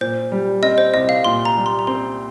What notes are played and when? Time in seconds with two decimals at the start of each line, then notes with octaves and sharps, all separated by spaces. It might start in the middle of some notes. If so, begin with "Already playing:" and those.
0.01 A#2 C5
0.32 G3
0.62 C4 D#5
0.78 C5
0.94 C2 D#5
1.09 F5
1.24 A#2 C6
1.45 A#5
1.57 G3
1.66 C6
1.79 A#5
1.87 C4 C6